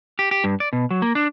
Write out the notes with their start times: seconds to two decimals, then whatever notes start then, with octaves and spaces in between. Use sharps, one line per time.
0.19 G4
0.31 G4
0.44 G2
0.60 D5
0.73 B2
0.90 F#3
1.02 A#3
1.15 D4